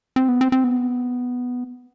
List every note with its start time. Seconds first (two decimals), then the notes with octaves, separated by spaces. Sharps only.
0.16 C4
0.28 B3
0.41 C4
0.52 C4
0.64 B3